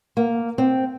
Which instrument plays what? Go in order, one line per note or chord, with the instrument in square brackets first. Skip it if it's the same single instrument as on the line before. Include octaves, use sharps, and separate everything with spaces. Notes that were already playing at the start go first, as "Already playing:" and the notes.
[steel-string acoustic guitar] A#3
C4